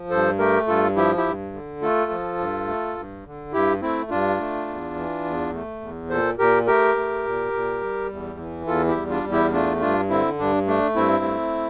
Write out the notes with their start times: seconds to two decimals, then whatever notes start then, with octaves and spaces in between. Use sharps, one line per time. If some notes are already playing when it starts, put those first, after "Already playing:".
Already playing: F3
0.10 G2 A4 C5
0.38 A3 G4 A#4
0.67 G2 F4 A4
0.96 F3 E4 G4
1.17 E4 G4
1.25 G2
1.53 D3
1.82 A3 F4 A4
2.11 F3
2.39 G2
2.68 A3
2.97 G2
3.25 D3
3.53 G2 E4 G4
3.82 A3 C4 E4
4.10 G2 D4 F4
4.39 A3
4.68 E2
4.96 E3
5.25 E2
5.53 A3
5.81 E2
6.10 A#2 A4 C5
6.38 A#2 G4 A#4
6.67 A3 G4 A#4
6.97 A3
7.25 A#2
7.53 A#2
7.81 G3
8.10 E2
8.39 E3
8.67 E2 F4 A4
8.88 E4 G4
8.95 G3
9.10 D4 F4
9.24 E2
9.32 E4 G4
9.53 A3 D4 F4
9.81 G2 D4 F4
10.10 D3 C4 E4
10.38 G2 D4
10.67 A3 D4
10.96 G2 C4 E4
11.24 A3